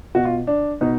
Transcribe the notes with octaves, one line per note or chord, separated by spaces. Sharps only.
B2 F#4
F4
D4
B2 D#4